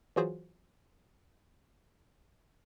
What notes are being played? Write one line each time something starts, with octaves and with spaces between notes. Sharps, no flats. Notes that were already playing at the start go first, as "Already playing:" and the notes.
E3 F#3 F4 F#4 G#4 C5